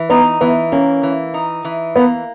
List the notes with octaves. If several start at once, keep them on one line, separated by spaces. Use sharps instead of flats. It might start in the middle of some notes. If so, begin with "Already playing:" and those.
Already playing: E3
B3 D#4
E3 B3
A#3 C#4
E3
D#4
E3
A#3 B3